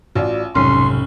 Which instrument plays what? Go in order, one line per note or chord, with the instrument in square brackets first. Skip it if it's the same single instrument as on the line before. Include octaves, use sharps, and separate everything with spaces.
[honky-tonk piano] A1 F4 [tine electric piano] F#4 D5
[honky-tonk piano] F1 [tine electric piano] B1 G#2 C3 [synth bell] C#4 [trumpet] C6